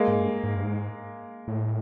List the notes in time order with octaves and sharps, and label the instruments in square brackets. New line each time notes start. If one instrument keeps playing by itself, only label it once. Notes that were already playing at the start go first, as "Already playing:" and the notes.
Already playing: [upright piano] G#3 A#3
[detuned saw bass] G#2
G2
G#2
G2
G#2
A2